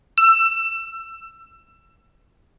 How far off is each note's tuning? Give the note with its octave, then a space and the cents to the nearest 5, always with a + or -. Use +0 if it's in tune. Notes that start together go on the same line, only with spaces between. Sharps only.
E6 +25